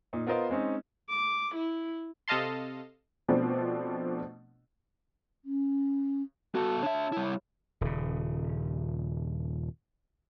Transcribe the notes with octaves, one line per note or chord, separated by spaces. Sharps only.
A#2 D#4
B3 F4 A#4 C5 D#5 F5
G#3 C4 C#4 D#4
D6
E4
C3 A4 D#5 F5 A5 C6
B2 F3 A3 B3 C4 D4
C#4
B3 F#4 A4 A5
D4 C#5 E5
G3 E4
D#1 C#3